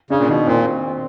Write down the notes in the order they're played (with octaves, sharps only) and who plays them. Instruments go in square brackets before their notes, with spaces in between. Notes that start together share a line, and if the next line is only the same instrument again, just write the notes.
[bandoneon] C#3 [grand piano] D4
[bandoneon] A#2
[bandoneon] B2 [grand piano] D#3
[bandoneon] A#2 [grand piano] C4